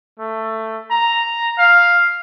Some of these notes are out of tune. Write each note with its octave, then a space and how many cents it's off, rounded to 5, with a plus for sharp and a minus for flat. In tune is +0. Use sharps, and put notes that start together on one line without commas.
A3 +10
A#5 +0
F5 +5